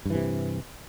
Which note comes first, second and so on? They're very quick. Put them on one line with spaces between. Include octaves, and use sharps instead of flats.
G2 E3 C3